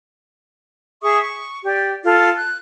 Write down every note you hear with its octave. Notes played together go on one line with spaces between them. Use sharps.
G#4 E5 C#6 D#6
C#6
G4 D5
F4 A4
F#6